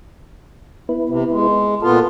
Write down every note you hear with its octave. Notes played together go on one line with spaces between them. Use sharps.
B3 E4 B4
C3
G#3
A#2 B3 F4 A4